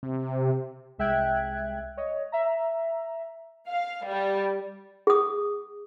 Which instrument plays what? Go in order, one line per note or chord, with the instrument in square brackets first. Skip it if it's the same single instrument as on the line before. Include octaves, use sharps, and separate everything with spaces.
[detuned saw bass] C3
[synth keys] C2 G#3 E5 G5 F#6 G#6
C#5 D#5
E5 A#5
[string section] F5
G3
[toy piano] G#4 D#6